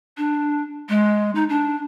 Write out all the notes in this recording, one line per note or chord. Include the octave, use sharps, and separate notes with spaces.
D4
G#3
D#4
D4